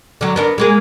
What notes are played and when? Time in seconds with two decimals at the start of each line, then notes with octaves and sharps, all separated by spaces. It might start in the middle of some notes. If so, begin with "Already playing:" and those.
0.21 D3 F#3
0.36 B3 D4 A#4
0.58 G#3 A#3 G#4